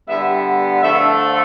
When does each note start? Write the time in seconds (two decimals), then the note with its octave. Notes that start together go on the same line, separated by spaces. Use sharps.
0.08 D3 G3 B3 E5
0.82 D3 F3 A3 E5